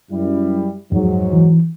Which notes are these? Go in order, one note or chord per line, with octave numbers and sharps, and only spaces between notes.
F#2 G3 E4
F2 G#2 F#3
E3